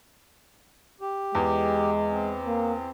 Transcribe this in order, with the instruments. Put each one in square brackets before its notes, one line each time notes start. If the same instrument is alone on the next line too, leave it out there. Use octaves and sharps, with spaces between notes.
[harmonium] G4
[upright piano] E2 [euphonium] G#3
[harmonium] C4
[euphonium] A#3